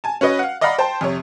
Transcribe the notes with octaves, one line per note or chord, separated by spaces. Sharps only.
G#5 A5
C#4 F#4 B4 D#5
F5 F#5
D5 D#5 F5 F#5 A#5 B5
C5 G5 A5
F2 C3 C#5